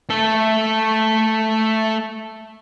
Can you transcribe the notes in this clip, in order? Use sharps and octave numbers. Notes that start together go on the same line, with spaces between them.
A3 A4